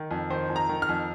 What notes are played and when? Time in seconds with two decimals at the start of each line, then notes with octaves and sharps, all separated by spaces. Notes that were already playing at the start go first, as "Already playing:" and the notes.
Already playing: D#3
0.11 F2
0.30 D#3 C5
0.49 F2
0.56 A#5
0.69 D#3
0.82 F6
0.89 F2